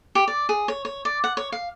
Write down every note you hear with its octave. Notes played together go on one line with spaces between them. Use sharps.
G4
D5
G#4
C#5
C#5
D5
F#5
C#5
F5